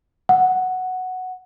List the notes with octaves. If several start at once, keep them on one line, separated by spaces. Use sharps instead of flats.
F#5